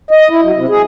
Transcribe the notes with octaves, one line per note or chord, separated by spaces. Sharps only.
D#5
E4
F#3
C3
G#4